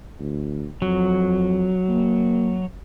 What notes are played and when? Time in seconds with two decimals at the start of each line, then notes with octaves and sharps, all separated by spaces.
0.20 D2
0.82 F2 F#3
1.89 A#3